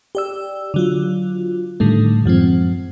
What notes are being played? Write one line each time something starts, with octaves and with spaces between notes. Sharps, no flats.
G4 D5 E6
D3 F#3 F4
A2 D3 D#3 G3 A3
F#2 F3 G#3 C4